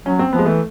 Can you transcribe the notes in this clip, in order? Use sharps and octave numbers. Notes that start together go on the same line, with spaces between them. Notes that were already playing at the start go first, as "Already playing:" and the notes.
F#3 C#4
C4
F3 B3
G#3
E3 A3